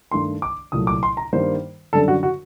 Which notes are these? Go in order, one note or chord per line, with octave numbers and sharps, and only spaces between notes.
G2 D#3 A3 C6
D6
C2 A#2 F#3 A3 D#6
D6
C6
A#5
G2 D#3 G3 A#3 C5
F#2 D3 G3 A4
F#4
F#4